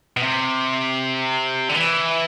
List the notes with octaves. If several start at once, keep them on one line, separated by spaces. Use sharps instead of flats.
B2
C3
D3
E3